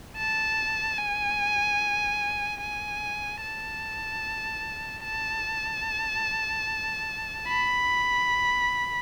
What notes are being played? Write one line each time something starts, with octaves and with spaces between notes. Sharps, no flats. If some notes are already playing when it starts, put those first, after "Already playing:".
A5
G#5
G#5
A5
A5
B5